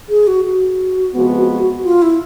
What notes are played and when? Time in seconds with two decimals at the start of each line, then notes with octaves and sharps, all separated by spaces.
0.09 G#4
0.27 F#4
0.45 F#4
1.15 C3 F3 G#3 B3
1.84 F4
2.02 E4